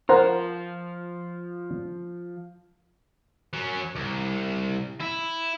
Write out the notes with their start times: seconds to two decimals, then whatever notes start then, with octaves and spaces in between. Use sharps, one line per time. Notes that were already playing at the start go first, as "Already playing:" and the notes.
0.09 F3 F4 A#4 C5 F#5
3.53 F#3 C#4
3.95 C2
5.00 E4